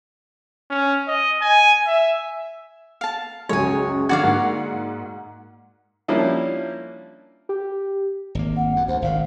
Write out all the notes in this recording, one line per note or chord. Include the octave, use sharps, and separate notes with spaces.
C#4
D#5
G#5
E5
F5 A5
C#2 F#2 G#3 C#5 G#5
D3 F#4 D5 F5 G#6
G#2 A#3 F#5
F3 G3 A#3 C#4 D4 E4
G4
G#1 A#3
F#5
F#2
D2 C5
G#1 A#2 F5